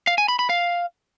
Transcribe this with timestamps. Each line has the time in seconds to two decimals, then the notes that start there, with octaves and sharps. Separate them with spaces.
0.07 F5
0.18 G#5
0.28 B5
0.39 B5
0.50 F5